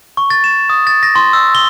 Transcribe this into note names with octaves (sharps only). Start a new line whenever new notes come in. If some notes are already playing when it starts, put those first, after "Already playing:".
C#6
A6
E7
D#6
A6
A#6
C6
E6
G7